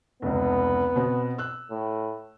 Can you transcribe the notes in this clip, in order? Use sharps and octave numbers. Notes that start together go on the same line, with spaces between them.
F1 C#2 B3
B2 C4
E6 F#6
A2